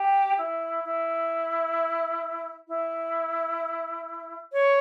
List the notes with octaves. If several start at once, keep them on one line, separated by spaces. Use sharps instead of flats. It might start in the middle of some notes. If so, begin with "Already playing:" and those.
Already playing: G4
E4
E4
E4
C#5